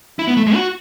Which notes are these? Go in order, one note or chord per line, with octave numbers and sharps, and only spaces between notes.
E4
B3
A3
G#3
F#4